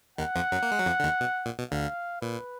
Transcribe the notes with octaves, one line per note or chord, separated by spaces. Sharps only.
D#2 D#3 F#5
F2 F3
F#2 F#3
A#3
G#3
F#3
F2 F3
D3
D#2 D#3
B2
A#2
B2
D2 D3 F5
A#2 B4